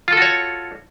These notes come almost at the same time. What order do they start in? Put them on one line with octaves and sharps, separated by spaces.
F4 A4 F#4 C#5